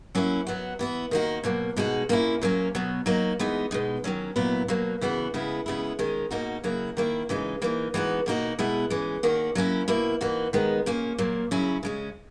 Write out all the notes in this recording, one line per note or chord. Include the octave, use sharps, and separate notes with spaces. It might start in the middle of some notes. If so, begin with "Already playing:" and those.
F#3 A#3 C#4 E4
F#3 B3 F#4
E3 B3 E4
D#3 A#3 D#4 F#4
B2 F#3 A#3
B2 G#3 D#4 F#4
A#2 A#3 C#4 E4
A#2 F#3 A#3 C#4
B2 F#3 B3
F#3 A#3 D#4 F#4
E3 G#3 B3 D#4
B2 G#3 D#4
D#3 F#3 C#4
A#2 F#3 B3 E4
B2 F#3 A#3
C#3 E3 B3 F#4
C#3 G#3 B3 E4
C#3 G#3 B3 E4
D#3 G#3 C#4
B2 A#3 D#4 F#4
C#3 F#3 A#3 E4
D#3 A#3 E4
C#3 E3 G#3 D#4
E3 A#3 D#4
E3 G#3 B3 D#4 F#4
B2 A#3 D#4 F#4
B2 G#3 B3 E4
E3 G#3 C#4
D#3 A#3 C#4 F#4
F#3 A#3 C#4 E4
B2 A#3 E4
E3 A#3 D#4 F#4
D#3 G#3 B3 D#4
A#2 A#3 C#4
A#2 F#3 A#3
C#3 F#3 C#4 E4
C#3 G#3 C#4